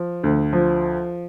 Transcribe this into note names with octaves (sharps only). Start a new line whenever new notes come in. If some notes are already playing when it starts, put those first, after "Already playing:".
Already playing: F3
D2
F3